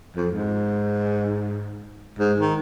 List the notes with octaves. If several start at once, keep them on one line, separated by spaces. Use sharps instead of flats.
F2
G#2
G#2
D#3